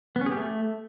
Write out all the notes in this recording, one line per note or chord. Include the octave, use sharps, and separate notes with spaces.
B3
C#4
G#4
G4
A3